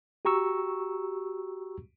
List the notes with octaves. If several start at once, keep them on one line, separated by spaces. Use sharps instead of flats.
F#4 G4 A#5 C#6 E6